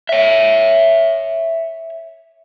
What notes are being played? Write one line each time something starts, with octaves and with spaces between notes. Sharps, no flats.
C#5 E5